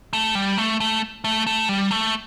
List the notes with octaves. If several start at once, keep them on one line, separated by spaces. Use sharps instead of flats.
A3
G3
A3
A3
A3
A3
G3
A3